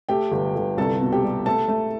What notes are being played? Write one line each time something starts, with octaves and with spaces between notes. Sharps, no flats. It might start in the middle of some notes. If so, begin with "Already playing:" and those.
A3 G4 G5
G1
G1
C2 A4 A5
B2
G4 G5
G3
A3 A4 A5
A3